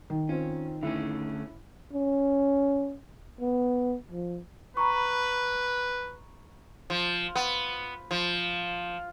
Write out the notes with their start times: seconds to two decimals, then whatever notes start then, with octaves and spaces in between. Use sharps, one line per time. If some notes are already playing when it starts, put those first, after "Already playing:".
0.10 D#3
0.29 C4 C#4 F4
0.83 D3 A3 C#4 E4
1.93 C#4
3.41 B3
4.12 F3
4.77 B4 A#5 B5 C#6
6.90 F3
7.36 B3
8.11 F3